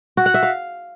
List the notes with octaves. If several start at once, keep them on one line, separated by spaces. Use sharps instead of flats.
F#4
F#5
E5
F5